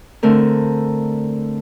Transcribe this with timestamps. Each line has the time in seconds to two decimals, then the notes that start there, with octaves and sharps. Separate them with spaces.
0.23 D3 A3 C4 A#4